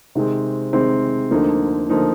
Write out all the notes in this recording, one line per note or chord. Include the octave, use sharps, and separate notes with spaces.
C3 D#3 G#3 C4
C3 D#3 G#3 C4
D2 D3 F3 A#3 D#4
D3 F3 A#3 D#4